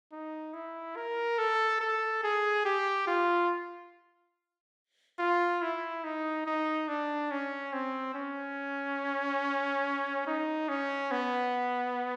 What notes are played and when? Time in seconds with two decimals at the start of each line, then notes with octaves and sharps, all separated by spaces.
0.12 D#4
0.54 E4
0.97 A#4
1.39 A4
1.81 A4
2.24 G#4
2.65 G4
3.07 F4
5.19 F4
5.62 E4
6.04 D#4
6.47 D#4
6.89 D4
7.31 C#4
7.73 C4
8.15 C#4
10.27 D#4
10.69 C#4
11.11 B3